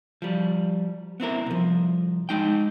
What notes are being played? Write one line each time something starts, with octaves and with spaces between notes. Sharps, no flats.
F3 G3
B3 C4 E4 A#4
C2 F3
G#3 D#4 G5